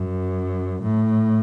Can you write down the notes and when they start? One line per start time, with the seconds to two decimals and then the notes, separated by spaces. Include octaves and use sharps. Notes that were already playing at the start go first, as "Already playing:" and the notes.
Already playing: F#2
0.82 A2